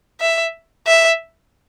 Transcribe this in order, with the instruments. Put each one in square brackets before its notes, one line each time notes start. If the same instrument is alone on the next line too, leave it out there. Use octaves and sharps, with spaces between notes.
[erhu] E5
E5